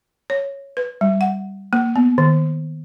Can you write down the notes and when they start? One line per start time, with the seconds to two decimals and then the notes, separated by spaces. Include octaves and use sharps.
0.30 C#5
0.77 B4
1.01 G3
1.21 F#5
1.73 A#3
1.96 B3
2.18 D#3